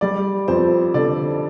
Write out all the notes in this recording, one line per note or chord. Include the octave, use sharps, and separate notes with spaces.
G3 D5
F2 C5
D3 D5